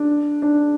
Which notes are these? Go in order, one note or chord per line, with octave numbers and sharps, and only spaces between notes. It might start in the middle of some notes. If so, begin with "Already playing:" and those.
Already playing: D4
D4